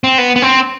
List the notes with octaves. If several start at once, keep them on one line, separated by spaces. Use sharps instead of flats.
C4
B3
B3
C4